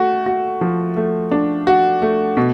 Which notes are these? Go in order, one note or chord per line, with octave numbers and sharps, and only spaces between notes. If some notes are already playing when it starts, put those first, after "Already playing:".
Already playing: A3 F#4
F#4
F3
A3
D4
F#4
A3
B2